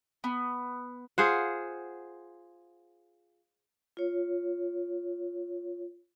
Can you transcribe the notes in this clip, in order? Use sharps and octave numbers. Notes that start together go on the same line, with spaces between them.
B3
F4 G#4 C5 F#5
F4 C#5